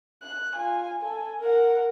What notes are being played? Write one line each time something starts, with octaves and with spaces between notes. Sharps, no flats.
F#6
F4 G#5
A4 G#5
A#4 F#5